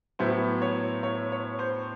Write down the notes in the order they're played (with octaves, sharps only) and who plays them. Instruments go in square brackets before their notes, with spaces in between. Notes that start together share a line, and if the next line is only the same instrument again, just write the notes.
[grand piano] A2 F#3 B3 E4 C5
C#5
C#5
C#5
C5